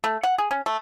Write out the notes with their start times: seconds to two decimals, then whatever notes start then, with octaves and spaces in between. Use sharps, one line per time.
0.04 A3
0.23 F#5
0.38 G#4
0.51 C#4
0.66 A3